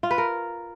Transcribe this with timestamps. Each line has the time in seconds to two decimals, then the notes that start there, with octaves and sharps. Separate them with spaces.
0.03 F4
0.11 B4
0.18 A#4